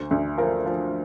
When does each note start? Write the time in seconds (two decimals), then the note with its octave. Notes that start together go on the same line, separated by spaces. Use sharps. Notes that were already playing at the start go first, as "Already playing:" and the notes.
Already playing: D2 C5
0.11 D2
0.38 F3 A#4
0.66 F3